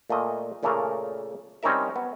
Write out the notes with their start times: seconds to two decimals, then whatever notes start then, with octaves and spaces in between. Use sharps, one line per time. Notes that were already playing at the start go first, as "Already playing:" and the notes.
0.10 A#2 A3 A#3 D#5
0.63 A#2 C#3 A3 A#3 A4 A#4
1.63 G3 C4 C#4 D#4 A#4 E5
1.96 B3